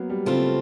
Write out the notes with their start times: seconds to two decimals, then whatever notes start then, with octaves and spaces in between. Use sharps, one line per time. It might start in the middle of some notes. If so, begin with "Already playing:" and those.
Already playing: F#3 A#3 B3
0.10 G3
0.26 C#3 A3 C4 F4